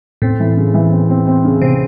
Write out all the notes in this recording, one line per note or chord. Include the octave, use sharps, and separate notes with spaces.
A2 C4
E3
C#3
E3
C4
C4
C4
C#3
C3 C4